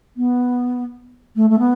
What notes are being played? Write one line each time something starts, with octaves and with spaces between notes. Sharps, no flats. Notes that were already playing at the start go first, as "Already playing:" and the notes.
B3
A3
A3
B3